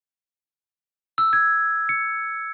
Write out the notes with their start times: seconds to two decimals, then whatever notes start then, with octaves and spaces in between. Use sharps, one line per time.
1.18 E6
1.33 G#6
1.89 C#7